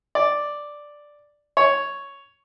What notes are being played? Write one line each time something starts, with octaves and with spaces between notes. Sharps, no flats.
D5
C#5